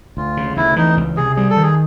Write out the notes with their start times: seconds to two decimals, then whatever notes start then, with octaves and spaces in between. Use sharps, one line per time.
0.17 D2 F4
0.37 C#3
0.56 D2 E4
0.76 E3 D#4
0.97 C#2
1.17 C3 G#4
1.36 G3 G#4
1.50 A4
1.57 D#3
1.63 G#4